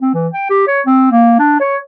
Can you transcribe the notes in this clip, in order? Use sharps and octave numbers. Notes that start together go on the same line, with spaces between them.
C4
E3
G5
G4
C#5
C4
A#3
D4
C#5